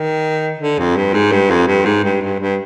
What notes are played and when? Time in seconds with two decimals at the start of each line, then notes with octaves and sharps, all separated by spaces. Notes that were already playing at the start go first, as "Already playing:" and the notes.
Already playing: D#3
0.60 D3
0.78 F2
0.97 G2
1.14 G#2
1.32 G2
1.50 F2
1.67 G2
1.85 G#2
2.04 G2
2.22 G2
2.40 G2